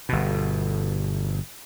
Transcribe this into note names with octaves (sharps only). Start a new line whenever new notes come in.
G1 B2